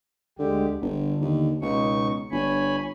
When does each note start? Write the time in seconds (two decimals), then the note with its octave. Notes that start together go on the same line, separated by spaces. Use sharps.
0.39 D2 D3 G#3 G4
0.81 G1 D3
1.21 D#2
1.62 C#2 B2 D#4 C#6
2.31 G1 C#5 G#5 B5